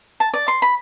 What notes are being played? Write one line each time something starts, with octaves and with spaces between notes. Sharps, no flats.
A5
D5
C6
B5